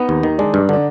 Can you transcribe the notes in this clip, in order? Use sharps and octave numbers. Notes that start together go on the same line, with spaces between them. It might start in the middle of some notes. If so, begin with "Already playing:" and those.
Already playing: B3 D#4
D#2
D#3
G#3 D4
G2
D3 D4